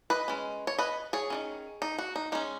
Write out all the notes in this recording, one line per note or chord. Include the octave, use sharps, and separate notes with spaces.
B4 D#5
G#3 C#4
C#5
B4 D#5
G#4 C#5
D#3 G#3 C#4
D#4
F#4
D#4
G#3 C#4 D#4